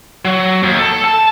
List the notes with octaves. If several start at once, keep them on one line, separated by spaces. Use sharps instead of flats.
F#3
D#2
A4
A5